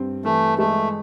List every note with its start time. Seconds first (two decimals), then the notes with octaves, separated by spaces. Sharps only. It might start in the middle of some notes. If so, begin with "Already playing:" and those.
Already playing: G2 C4
0.25 E3 A3
0.58 G#3 A3